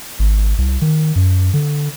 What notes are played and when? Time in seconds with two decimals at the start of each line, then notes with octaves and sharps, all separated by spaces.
0.19 G#1
0.58 C2
0.81 D#3
1.16 F#2
1.54 D3